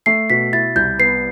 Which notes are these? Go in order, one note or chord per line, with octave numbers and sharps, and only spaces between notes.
A3 C7
B2 B6
E4 A6
C2 G6
B3 C7